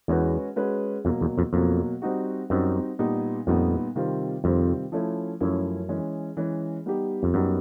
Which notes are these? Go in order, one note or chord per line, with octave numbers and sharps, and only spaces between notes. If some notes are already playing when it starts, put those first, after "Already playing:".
E2 G#3 C#4 F#4 B4
G#3 C#4 F#4 B4
F2 B2 F#3 A#3
E2
F2
F2 B2 F#3 A#3
G3 C4 D#4 F#4
F#2 G3 C4 D#4 F#4
A#2 G3 B3 D#4 G4
F2 A#2 G3 B3 D#4 G4
C3 D#3 G3 C4 F4
F2 C3 D#3 G3 C4 F4
F3 A3 C#4 E4
F#2 F3 A3 C#4 E4
E3 G#3 C#4
E3 G#3 C#4
G3 B3 D#4 G4
F2
F#2 G3 B3 D#4 G4